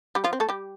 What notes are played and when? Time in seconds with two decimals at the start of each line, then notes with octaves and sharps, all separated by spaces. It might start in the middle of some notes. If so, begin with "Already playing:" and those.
0.15 G3 G4
0.24 F3 F4
0.33 C4
0.40 A3 A4
0.49 G3 G4